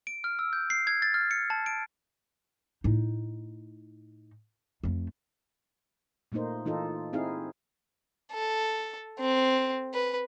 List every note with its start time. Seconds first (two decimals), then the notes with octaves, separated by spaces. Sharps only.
0.07 D7
0.24 F6
0.39 E6
0.53 G6
0.70 C7
0.87 G#6
1.02 A6
1.14 F6
1.31 C#7
1.50 A5
1.66 D7
2.84 A2 D#4
4.83 F2 A3
6.32 A#2 A3 A#3 D#4 C5
6.65 E3 D#4 F4 A4
7.13 C4 D#4 E4 G#4 F5
8.32 A4
9.19 C4
9.94 B4